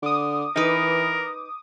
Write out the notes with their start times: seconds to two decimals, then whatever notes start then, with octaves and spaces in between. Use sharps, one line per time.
0.03 D3 D6 D#6
0.56 E3 D#4 A#4 B4